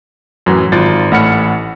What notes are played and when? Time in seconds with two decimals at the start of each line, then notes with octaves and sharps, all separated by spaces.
0.46 F#2 A2 E3 F#3
0.72 G#1 F4 A6
1.11 A1 A3 F#5 B5 F6 C#7